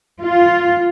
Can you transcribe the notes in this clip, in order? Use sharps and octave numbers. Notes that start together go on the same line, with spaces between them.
F4